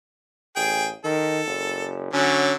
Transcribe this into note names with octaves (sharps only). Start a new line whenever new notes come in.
A1 G#4 G5
D#3 A4
F#1
D3 F#3 C#4